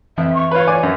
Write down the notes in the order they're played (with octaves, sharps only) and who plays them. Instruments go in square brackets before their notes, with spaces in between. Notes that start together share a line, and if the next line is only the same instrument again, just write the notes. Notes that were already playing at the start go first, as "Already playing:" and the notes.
[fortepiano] F2 [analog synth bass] E3 [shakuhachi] E5
[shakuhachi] C#6
[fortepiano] F4 B4 [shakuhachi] C#5
[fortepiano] D5 G#5 D6
F#2